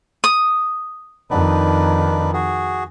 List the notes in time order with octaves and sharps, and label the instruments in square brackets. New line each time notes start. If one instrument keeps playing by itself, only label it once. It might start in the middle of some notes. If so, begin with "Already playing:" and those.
[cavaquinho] D#6
[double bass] F2 D#3 [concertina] D4 D#4 B4
[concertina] F#4 G#4